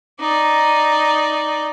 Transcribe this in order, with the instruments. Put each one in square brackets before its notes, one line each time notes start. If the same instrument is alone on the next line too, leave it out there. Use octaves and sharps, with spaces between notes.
[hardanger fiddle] D#4 D5